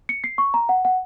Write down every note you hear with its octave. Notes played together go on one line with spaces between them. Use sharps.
C#7
C7
C#6
A#5
F#5
F#5